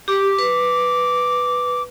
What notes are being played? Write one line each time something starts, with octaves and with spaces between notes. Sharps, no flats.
G4 D6
B4